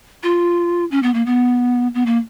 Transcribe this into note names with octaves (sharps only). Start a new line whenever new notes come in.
F4
C#4
B3
A#3
B3
B3
A#3